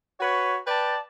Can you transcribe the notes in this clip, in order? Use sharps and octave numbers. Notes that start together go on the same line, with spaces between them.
F#4 B4 C#5
B4 D5 G5 A5